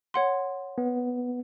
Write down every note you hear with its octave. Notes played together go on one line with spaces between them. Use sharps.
C#5 F#5 C6
B3